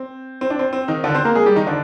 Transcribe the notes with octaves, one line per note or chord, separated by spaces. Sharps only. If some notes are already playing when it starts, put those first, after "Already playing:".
Already playing: C4
C4
D4
C4
C4
D#3 D#4
D3 D4
C4 C5
A#3 A#4
G#3 G#4
G3 G4
D#3 D#4
D3 D4